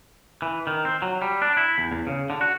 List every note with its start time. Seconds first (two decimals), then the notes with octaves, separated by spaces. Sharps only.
0.42 E3
0.67 D#3
0.85 C4
1.02 F#3
1.22 G3
1.42 D4
1.57 E4
1.78 E2
1.92 E2
2.07 C#3
2.30 D3
2.41 F#4